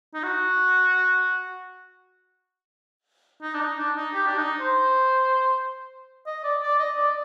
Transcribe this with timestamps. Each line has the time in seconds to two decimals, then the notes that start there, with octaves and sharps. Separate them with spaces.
0.14 D#4
0.23 F#4
3.42 D#4
3.55 D4
3.61 D#4
3.78 D4
3.96 D#4
4.14 G4
4.26 D4
4.37 D#4
4.60 C5
6.27 D#5
6.44 D5
6.62 D5
6.79 D#5
6.97 D5